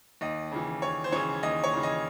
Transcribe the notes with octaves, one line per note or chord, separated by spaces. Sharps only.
D#2 D#5
C#3 E3
D#2 C#5
C5
C#3 E3 C#5
D#2 D#5
C#5
C#3 E3
D#5